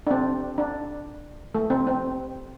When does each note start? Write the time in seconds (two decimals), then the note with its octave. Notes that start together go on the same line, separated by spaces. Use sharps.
0.07 D4
0.11 C4
0.58 D4
1.55 A3
1.70 C4
1.87 C4